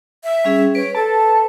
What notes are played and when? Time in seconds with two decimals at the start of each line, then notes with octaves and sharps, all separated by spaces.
0.24 E5
0.45 G3 C#4 G#4
0.75 B4 C#5 D7
0.95 A4 A5